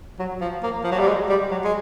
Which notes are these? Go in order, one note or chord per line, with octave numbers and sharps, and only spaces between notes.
F#3
F3
A#3
F3
F#3
G3
G#3
G3
F#3
G#3